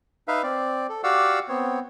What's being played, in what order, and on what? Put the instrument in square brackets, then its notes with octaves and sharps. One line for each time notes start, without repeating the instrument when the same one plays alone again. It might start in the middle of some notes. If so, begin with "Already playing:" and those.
[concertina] D#4 B4 E5 F5
C4 D5
A4
F#4 G4 D5 F5 F#5 E6
B3 C4 C#5